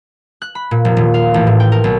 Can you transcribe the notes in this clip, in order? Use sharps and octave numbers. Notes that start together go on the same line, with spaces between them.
F#6
B5
A#2
F1
D#1
F5
A1
A2
G5
A#4
B1